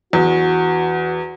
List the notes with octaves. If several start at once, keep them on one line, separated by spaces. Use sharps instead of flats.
E2 F#4